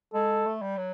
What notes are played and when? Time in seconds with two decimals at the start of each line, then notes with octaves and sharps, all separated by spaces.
0.14 G#3 A4
0.46 A3
0.62 G3
0.77 F#3